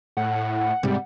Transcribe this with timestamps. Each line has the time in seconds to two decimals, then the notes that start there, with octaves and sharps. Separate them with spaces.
0.17 A2 F#5
0.83 G#2 C3 G3